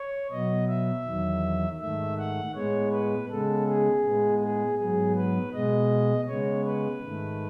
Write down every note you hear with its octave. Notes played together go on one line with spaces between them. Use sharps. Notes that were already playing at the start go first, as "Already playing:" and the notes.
Already playing: C#5
B2 F#3 B3 D#5
E5
E2 D#3 F#3
G#2 D#3 A3 E5
F#5
A2 G#3 B3 C#5
B4
C#3 G#3 B3 A4
G#4
A2 G#3 B3
G#4
G#2 F#3 B3 G#4
B4
B2 G#3 B3 D#5
C#3 G#3 B3 C#5
B4
G#2 D#3 A3